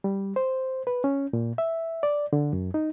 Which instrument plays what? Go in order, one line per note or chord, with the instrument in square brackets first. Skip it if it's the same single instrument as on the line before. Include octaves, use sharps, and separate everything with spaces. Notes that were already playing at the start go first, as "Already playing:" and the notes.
[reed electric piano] G3
C5
B4
C#4
A#2
E5
D5
D3
F#2
D#4